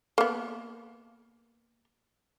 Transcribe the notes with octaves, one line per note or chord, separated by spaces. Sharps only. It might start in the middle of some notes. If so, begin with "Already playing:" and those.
A#3 B3